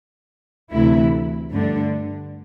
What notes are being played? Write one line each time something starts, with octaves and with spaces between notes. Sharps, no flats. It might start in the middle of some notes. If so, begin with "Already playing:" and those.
D2 C3 E3 A3 E4
G2 D3 A3 D4